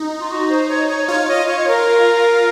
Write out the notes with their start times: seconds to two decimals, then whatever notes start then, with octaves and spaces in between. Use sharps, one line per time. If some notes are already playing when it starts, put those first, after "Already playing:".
Already playing: D#4
0.20 F4
0.30 F#4
0.49 C5
0.69 C#5
0.88 C#5
1.08 F4 C#5
1.28 D#5
1.48 C#5
1.68 A#4